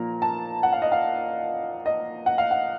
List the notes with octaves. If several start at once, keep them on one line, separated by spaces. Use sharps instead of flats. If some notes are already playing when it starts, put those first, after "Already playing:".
Already playing: A#2 F3 A#3 A#5
A5
F#5
F5
D#5
F5
D#5
F#5
F5
F#5